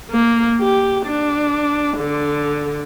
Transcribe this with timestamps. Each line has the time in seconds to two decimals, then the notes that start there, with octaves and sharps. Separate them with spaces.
0.10 A#3
0.61 G4
1.06 D4
1.98 D3